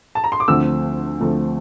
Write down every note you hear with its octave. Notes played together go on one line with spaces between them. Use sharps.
A5
A#5
C6
D6
D2 D3 F3 A3 C4 E6
D2 D3 F3 A3 C4